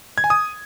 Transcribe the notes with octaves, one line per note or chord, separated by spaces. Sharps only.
G#6
G#5
D#6